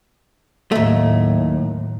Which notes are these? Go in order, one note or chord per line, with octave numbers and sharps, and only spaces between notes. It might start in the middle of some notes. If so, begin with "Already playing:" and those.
D#2 A2 F#3 A3